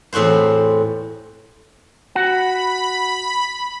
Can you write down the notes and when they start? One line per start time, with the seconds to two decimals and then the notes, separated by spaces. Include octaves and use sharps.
0.13 E2 A2 C4 F#4 C5
2.15 F#4 F#5 B5